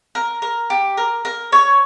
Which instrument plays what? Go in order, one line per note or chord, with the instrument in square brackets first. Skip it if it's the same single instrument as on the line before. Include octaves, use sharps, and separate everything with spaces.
[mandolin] A#4
A#4
G4
A#4
A#4
C#5